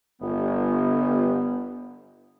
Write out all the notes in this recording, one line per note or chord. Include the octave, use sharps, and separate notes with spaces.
G1 B3